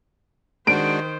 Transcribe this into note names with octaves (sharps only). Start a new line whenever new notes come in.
D#3 G#3 D4 F#4 C5 D7